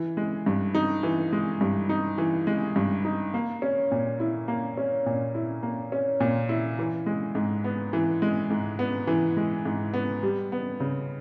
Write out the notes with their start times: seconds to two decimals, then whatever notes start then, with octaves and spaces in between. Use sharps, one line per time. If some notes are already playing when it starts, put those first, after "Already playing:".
Already playing: E3
0.17 G#3
0.46 G2
0.75 D#4
1.03 E3
1.32 G#3
1.61 G2
1.89 D#4
2.18 E3
2.47 G#3
2.76 G2
3.05 D#4
3.34 A#3
3.62 C#4
3.92 A#2
4.20 E4
4.48 A#3
4.77 C#4
5.06 A#2
5.35 E4
5.63 A#3
5.92 C#4
6.20 A#2
6.49 E4
6.79 E3
7.06 G#3
7.35 G#2
7.64 B3
7.93 E3
8.22 G#3
8.50 G#2
8.79 B3
9.07 E3
9.37 G#3
9.65 G#2
9.94 B3
10.23 G3
10.52 B3
10.80 C#3